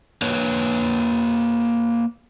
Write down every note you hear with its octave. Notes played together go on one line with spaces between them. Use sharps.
A#3 B4 C#5